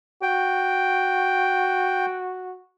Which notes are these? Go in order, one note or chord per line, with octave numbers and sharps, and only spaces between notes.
F#4 G5